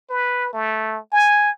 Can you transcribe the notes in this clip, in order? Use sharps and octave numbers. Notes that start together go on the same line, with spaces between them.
B4
A3
G#5